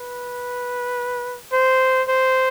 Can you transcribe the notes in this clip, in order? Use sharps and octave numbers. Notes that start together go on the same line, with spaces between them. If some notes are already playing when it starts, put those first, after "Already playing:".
Already playing: B4
C5
C5